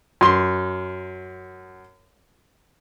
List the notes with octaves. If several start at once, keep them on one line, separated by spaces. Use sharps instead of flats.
F#2 C6